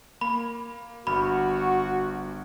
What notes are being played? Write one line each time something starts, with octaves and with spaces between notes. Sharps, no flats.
A#3 B5
G1 F#4 B5 F6